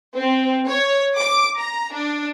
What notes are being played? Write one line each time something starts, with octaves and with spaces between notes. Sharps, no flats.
C4
C#5
D6
A#5
D4